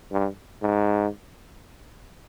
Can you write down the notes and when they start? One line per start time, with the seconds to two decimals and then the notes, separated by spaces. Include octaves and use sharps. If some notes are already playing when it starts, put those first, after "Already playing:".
0.12 G2
0.62 G#2